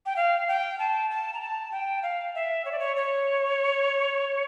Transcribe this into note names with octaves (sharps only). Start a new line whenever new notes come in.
G5
F5
G5
A5
A5
A#5
A5
G5
F5
E5
C#5
D5
C#5
C#5